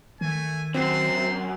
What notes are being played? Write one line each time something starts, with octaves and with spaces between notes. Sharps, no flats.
D#3 A3 G#5
F#2 C4 C6